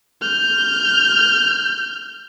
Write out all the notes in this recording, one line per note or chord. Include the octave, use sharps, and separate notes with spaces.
F6 G6